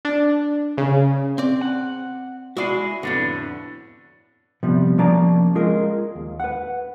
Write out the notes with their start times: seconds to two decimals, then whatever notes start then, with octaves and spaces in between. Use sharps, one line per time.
0.05 D4
0.78 C#3
1.38 C4 D5
1.61 F#5
2.57 G#3 E4 F#4 G#4 D5
3.03 F2 A2 D3 B3 D4
4.63 C3 F3 G3 B3
4.98 F3 A#3 C#4 D5 A5 A#5
5.55 G#3 F4 G#4 A#4
6.15 D#2
6.40 B4 F#5